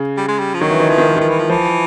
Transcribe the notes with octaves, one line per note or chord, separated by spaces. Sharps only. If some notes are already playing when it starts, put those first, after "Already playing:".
Already playing: C#3
G3
G#3
G3
F3
D#3 F#3
E3
D#3
E3 F3
D#3
E3
D#3 F3
E3
F3
E3 F3